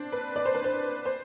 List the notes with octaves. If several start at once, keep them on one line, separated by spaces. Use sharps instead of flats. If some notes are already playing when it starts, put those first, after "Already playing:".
Already playing: C4 D4
B4
D5
C5
B4
C5
C5